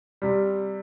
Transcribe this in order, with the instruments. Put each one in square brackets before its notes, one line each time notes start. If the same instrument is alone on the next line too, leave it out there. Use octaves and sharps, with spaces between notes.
[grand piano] C3 G3